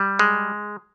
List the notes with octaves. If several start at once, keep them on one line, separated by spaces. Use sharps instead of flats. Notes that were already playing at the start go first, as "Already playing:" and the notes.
Already playing: G3
G#3